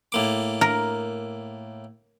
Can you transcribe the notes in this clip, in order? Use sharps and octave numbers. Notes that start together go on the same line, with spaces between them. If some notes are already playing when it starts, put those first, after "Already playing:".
A2 A#3 D6
A#4